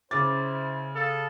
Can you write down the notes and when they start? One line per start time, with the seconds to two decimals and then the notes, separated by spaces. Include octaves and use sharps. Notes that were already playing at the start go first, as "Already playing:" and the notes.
0.11 C#3 E4 C5 D6 A6
0.95 A4 F5 A5 D#6